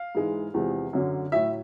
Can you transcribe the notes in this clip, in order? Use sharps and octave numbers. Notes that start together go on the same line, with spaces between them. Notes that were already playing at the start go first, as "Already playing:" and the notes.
Already playing: F5
G#2 E3 G#3
E2 C3 F3 G#3
F#2 D3 F#3
A2 F#3 E5